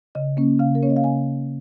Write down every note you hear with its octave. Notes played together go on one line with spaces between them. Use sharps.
C#3 D#5
A#3 C#4
C#3 F5
A#4
A#3 C#4 C#5
D#5
F5
C#3 G#5